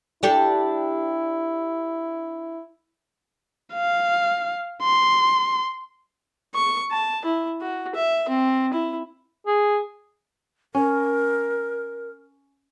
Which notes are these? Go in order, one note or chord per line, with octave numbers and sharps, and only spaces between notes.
D4 E4 G4 A4
F5
C6
C#6
A5
E4
F#4
E5
C4
E4
G#4
C#4 A#4